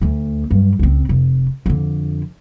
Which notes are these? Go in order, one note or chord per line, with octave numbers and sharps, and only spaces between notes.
D2 A3
G2 F#3
C#2 C4
F1
F2 D3